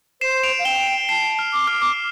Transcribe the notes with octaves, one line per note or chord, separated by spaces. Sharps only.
C5 C7 E7
D7 F7
F5
G5 E7 G7
D7 F7
A5 C7 E7
F6
D6
F6
D6